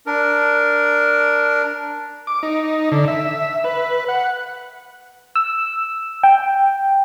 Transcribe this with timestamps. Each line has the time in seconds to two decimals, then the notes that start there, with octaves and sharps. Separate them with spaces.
0.07 D4 A#4
2.27 D6
2.43 D#4
2.92 D3
3.08 E5
3.64 B4
4.08 F#5
5.36 E6
6.23 G5